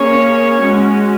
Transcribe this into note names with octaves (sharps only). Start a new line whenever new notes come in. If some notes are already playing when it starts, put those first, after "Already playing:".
Already playing: A#3 C#4 G#4 C#5
G#3 C#4 F#4